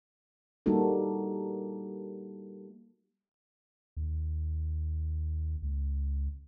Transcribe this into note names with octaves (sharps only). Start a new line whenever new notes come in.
G3 A#3 D#4 F#4 A4
D#2
C#2